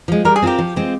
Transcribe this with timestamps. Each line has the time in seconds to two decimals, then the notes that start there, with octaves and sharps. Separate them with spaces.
0.08 F3 G#3
0.25 G3 A#4
0.36 G#4
0.42 C4 F4 G4 A#4
0.58 F3
0.76 G#3 C4 F4